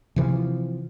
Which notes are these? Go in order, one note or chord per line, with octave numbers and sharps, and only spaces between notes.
C3 E3 F3